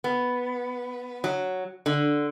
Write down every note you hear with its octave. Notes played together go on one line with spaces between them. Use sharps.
B3
F#3
D3